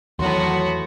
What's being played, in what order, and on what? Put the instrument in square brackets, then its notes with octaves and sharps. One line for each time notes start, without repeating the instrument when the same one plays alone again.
[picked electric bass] E2 D#3 [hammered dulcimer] A2 C6 [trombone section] F#3 [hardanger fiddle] B3 F#4